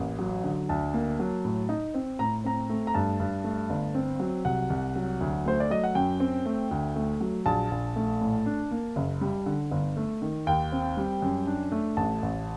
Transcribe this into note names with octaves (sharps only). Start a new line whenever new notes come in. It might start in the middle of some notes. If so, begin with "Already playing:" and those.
Already playing: A1 A#3
F#3
D3
D2 A5
A#3
F#3
A2
D#4
C4
A2 A#5
C4 A#5
A3
A#5
G2 A5
G2
A3
G1
C4
F#3
C2 F#5
C2
F#3
D2
A3 C5
D5
F#3 D#5
F#5
F#2 G5
C4
A3
D2
A3
F#3
A#1 A5
A#1
A3
A2
D4
A#3
F#1
G3
D3
G1
A3
D#3
D#2 G5
C4
G3
F#2
D4
A3
A1 A5
A1